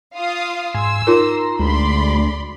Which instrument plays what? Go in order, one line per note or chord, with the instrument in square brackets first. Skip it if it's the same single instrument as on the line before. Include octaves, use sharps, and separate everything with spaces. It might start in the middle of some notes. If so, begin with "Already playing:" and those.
[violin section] F4 F5 D#6
[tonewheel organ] G#2 G#5 C6 [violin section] E6
[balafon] D#4 F4 A#4 [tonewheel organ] A#5 C6
[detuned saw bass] D2 [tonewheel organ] G#3 [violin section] D5 B5 C6